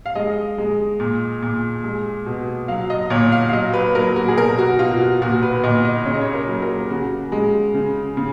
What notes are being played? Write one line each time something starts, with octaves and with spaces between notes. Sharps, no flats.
F5
G#3 D#5
G#3
A#2
A#2
G#3
B2
F#3 F5
D#5
A#2 C#5
F5
F5
F#3 D#5
B4
F#3 A#4
F#4
G#4
B2 A#4
F#4
B2 F4
F#4
A#2 F#4
B4
A#2 D#5
D#5
C#3 C#5
D#5
C#5
A#4
F#3
A#4
C#3 F#4
G#3
C#3
C#3